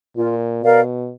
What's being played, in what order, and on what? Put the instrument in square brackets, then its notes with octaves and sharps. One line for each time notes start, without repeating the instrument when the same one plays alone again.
[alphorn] A#2 [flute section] F4
[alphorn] B2 [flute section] A#4 D5 F5